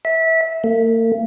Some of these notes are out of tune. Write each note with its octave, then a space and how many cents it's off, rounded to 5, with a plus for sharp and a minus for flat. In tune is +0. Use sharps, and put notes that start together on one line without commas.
E5 -20
A#3 -45